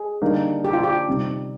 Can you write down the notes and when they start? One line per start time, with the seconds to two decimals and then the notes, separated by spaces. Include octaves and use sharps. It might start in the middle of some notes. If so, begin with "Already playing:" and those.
Already playing: G#4
0.22 D3 G3 A#3 D#4
0.65 G4
0.73 F4
0.83 G4
1.07 C3 G3 C4 D#4